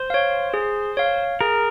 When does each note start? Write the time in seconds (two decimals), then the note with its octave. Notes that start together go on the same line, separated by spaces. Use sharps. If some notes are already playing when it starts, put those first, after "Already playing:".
Already playing: C5
0.10 C#5 F5
0.54 G#4
0.97 C#5 F5
1.41 G#4 A#4